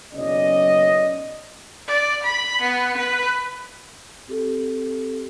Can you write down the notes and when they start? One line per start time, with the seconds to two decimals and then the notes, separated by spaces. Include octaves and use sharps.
0.14 F#1 B1 C#4 D5 D#5
1.88 D5
2.23 B5
2.61 B3
2.97 B4
4.28 C4 G4 A4